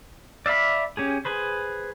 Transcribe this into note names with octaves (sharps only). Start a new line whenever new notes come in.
D5 E5 F5 B5
C#4 G4 G#4
G#4 B4 C5